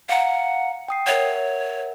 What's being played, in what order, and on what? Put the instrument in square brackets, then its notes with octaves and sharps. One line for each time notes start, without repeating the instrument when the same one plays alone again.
[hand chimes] F5 A#5 [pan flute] F#5
[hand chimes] G5 D#6 C7
[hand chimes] A#4 E5 F#5 [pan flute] C#5